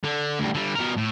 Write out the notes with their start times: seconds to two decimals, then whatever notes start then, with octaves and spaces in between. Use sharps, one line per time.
0.04 D3
0.40 D2 G3
0.55 D3 G3
0.76 B2 A#4
0.97 A2